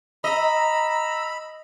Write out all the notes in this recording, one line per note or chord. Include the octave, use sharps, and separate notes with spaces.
D#5 A#5 B5 E6